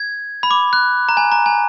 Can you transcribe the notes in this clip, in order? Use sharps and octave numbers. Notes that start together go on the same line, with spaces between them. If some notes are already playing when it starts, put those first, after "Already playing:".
Already playing: G#6
B5
D6
F#6
A#5
G#5
A#5
G#5